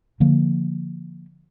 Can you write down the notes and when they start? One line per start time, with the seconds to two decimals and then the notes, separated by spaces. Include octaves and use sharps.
0.20 D3 F3 A#3